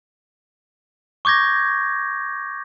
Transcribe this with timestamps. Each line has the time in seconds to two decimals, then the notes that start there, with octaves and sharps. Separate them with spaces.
1.25 C#6 D6 G6 G#6 A#6